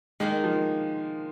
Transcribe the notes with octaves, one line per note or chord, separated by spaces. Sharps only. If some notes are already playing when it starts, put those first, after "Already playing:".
D#3 G#3 A#3 D#4
F3